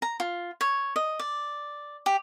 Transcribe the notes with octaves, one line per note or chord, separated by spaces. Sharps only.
A#5
F4
C#5
D#5
D5
G4